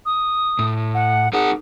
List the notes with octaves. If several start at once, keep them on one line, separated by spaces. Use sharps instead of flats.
D#6
A2
F#5
D#4 G#4 A#4 F#5